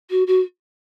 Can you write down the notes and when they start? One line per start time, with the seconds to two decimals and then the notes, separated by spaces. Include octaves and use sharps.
0.10 F#4
0.27 F#4